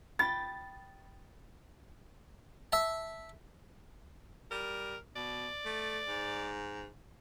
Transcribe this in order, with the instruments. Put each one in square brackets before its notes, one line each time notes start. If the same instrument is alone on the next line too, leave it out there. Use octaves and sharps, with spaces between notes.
[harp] G5 B5 G6 [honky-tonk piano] A6
[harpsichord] E5 A5
[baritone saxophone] G3 [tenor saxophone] A#4
[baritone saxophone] B2 [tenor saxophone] D5
[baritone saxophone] A3
G#2